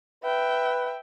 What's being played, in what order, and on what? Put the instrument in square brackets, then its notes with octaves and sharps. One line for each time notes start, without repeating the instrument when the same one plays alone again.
[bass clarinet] B4 [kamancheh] E5 G5